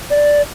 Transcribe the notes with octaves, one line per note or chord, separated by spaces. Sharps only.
D5